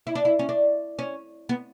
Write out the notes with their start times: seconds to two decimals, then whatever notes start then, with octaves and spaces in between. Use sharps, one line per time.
0.07 E4
0.15 D4
0.25 E4
0.39 C#4
0.49 D4
0.99 C#4
1.49 B3